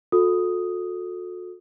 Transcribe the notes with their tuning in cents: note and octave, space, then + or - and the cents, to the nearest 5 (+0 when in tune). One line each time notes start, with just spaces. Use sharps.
F#4 -40 A4 +0 D#6 +0